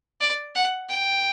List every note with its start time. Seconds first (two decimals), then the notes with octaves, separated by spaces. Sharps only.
0.20 D5
0.55 F#5
0.90 G5